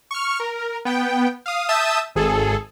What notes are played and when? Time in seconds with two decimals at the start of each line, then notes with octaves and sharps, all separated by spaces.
0.11 C#6 F6
0.40 A#4
0.85 B3 G5
1.46 F5 D#6
1.69 E5 A5 D#6 E6 G6 E7
2.15 G#1 G#4 A4